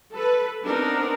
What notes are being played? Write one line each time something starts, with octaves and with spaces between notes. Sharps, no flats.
A4 B4
B3 C4 D4 D#4 A#4